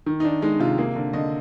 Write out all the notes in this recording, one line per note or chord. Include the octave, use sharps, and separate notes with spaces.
D#3
D#4
D#3 D4
G#3 D#4
C3 F4
A#3 G#4
D3 A#4
D3 D#5